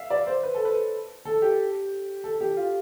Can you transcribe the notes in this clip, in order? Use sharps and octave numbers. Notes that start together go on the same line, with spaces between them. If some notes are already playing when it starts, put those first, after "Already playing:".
Already playing: E5 F5
D5
C5
B4
A4
B4
A4
G4
A4
G4
F4